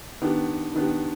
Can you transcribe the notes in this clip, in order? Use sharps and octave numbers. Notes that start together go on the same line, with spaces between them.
D#3 B3 D4 G4
D#3 B3 D4 G4